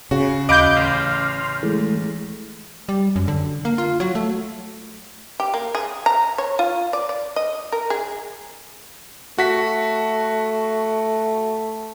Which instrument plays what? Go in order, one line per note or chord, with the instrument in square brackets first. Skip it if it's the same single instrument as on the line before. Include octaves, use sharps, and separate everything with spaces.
[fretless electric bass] C#3 [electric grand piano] F#4
[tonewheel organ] D#2 F#6 [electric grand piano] D#5 F5 B5 [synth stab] D6 G6
[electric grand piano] A1 [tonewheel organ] C6 F6
[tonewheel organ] E3 G#3 A3
[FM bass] G3
F#2
D3
A#3
F4
F#3
A3
[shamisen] G4
A#3
G#4
A#5
C#5
F4
D5
D5
D#5
A#4
G#4
[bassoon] A3 [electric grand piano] F#4 B6